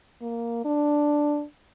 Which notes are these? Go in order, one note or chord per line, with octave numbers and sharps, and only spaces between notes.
A#3
D4